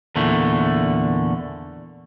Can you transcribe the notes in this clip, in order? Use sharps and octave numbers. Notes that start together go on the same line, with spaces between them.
E2 A#2 D3 A3